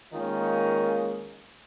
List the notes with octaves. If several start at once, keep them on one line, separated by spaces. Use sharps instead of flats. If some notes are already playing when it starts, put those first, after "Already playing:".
D#3 G#3 A#3 C#4 D#4 F4